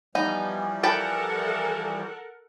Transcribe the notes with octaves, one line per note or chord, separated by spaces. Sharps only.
E3 F3 G3 B3 D#4
A4 A#4 F#5 G5 A5 B5